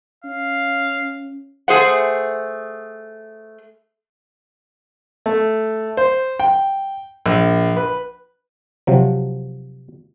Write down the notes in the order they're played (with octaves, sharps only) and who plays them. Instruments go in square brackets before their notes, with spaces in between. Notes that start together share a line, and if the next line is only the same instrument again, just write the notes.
[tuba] C#4 [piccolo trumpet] F5
[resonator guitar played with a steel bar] A3 G#4 C5 F#5
[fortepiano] A3
C5
G5
A#1
B4
[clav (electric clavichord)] C3 F3 F#3